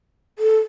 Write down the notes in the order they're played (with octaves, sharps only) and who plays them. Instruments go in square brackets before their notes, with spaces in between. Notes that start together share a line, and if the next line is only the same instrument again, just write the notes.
[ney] A4